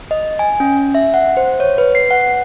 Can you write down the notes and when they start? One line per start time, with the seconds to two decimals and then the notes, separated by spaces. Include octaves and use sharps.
0.11 D#5
0.39 G#5
0.60 C#4
0.95 E5
1.14 F#5
1.37 C5
1.60 C#5
1.78 B4
1.95 C7
2.11 F#5